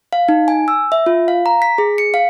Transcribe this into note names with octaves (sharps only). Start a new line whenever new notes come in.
F5
D#4
G#5
E6
E5
F4
F5
A#5
B6
G#4
C#7
F5